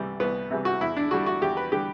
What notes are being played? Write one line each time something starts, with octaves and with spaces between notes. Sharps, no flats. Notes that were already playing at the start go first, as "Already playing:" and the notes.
Already playing: C2 C3 E3 G3
C2 B3
C3 E3 G3
F#4
E2 E4
D4
D3 G3 F#4
F#4
E2 G4
B4
D3 G3 G4